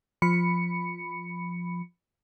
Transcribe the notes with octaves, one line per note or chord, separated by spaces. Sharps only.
F3 B5 C#7